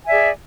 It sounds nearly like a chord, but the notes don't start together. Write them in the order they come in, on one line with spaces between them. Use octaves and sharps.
G#5 E5 D5 G#4